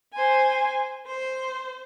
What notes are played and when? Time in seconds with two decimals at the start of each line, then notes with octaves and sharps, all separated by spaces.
0.11 C5 G#5
1.05 C5